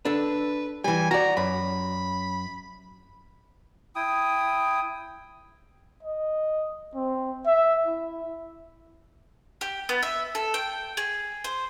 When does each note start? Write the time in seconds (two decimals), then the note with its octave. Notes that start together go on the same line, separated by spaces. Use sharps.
0.05 D4 A4 B4
0.84 E3 G3 G#5
1.11 F#4 D5 A#5
1.37 F#2 B5
3.95 E4 G5 D#6
6.03 D#5
6.95 C4
7.46 E5
7.86 E4
9.61 G4
9.89 B3
10.03 E5
10.35 A4
10.54 G5
10.97 G#4
11.44 C5